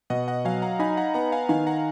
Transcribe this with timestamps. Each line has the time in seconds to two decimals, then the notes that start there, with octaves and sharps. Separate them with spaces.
0.10 B2 D#5 F#5
0.28 D#5 F#5
0.45 F#3 F5 G#5
0.62 F#5 A#5
0.79 D#4 G#5 B5
0.97 F#5 A#5
1.14 B3 F#5 A#5
1.32 F5 G#5
1.49 D#3 F5 G#5
1.67 F#5 A#5